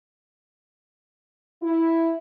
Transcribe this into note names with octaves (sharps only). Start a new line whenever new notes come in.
E4